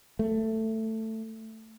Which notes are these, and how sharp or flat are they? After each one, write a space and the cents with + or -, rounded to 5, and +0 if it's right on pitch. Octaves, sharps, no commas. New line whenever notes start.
A3 +10